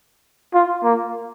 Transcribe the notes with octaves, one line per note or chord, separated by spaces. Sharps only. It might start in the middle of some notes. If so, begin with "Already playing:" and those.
F4
A#3